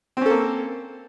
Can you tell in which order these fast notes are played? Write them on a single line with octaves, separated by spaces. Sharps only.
C4 C#4 A4 A#3